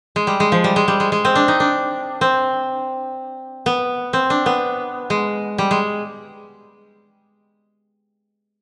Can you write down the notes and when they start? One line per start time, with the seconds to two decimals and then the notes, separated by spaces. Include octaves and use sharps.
0.16 G#3
0.27 G3
0.40 G#3
0.52 F3
0.64 G3
0.76 G#3
0.88 G3
1.00 G#3
1.12 G#3
1.25 C4
1.35 D4
1.48 D#4
1.60 D4
2.21 C4
3.66 B3
4.13 C4
4.30 D4
4.46 B3
5.10 G#3
5.58 G3
5.71 G#3